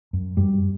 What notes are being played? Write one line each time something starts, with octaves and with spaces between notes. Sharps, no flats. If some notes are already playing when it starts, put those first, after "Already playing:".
F#2
F#2 G3